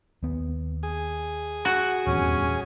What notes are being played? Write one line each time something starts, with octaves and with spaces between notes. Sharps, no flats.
D#2 B3
G#4
F#4
D#1 E2 G2 C#4